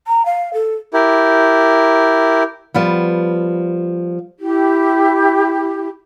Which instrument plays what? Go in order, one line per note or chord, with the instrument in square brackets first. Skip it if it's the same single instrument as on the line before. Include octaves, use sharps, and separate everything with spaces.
[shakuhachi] A#5
F5
A4
[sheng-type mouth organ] E4 G4 A#4
[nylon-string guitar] F3 G3 B3
[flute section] E4 G4